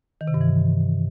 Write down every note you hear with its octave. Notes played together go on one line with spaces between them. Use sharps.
D#3
C3
G2
E3